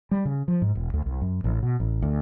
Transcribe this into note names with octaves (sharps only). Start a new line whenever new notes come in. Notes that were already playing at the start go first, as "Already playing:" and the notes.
G3
C#3
F3
G#2
E1
D2
C2
F#2
A1
B2
A1
D2